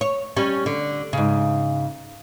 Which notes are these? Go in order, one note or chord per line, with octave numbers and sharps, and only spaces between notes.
C#5
G3 C#4
D3
G#2 C#3